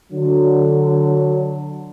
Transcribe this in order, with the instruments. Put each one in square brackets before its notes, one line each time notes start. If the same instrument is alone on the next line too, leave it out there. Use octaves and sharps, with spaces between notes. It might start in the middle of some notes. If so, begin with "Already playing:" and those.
[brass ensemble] D3 F#3